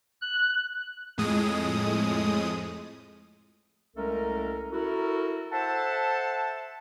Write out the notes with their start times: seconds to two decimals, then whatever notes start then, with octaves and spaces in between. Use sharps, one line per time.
0.21 F#6
1.18 F2 A2 G#3 D#6
3.96 C2 G#3 A3 C#4 A4 A#4
4.73 E4 F#4 A4 A#4
5.52 A4 C5 E5 F#5 A5